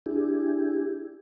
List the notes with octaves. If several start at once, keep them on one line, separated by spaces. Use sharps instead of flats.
D4 E4 G4 G#4